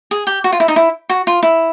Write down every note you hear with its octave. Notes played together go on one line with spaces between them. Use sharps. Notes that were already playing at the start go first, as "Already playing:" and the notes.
G#4
G4
F#4
F4
E4
D#4
E4
F#4
F4
E4